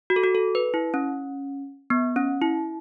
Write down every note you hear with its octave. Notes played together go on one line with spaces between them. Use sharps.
F#4
A4
F#4
A4
B4
E4
C#4
B3
C#4
E4